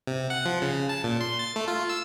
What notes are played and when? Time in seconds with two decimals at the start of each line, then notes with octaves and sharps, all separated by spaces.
0.07 C3
0.30 F#5
0.45 F3
0.62 C#3
0.89 A5
1.04 A#2
1.21 C6
1.39 A6
1.56 A3
1.68 F4
1.89 E6